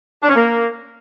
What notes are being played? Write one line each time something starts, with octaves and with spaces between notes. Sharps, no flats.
D4
C#4
A#3